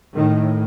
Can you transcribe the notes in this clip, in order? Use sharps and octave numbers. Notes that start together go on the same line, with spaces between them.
A2 D#3